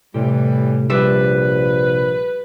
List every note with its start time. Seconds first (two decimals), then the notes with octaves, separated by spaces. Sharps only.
0.14 A2 C3 E3 G3 G4
0.90 A#1 G3 B4 E5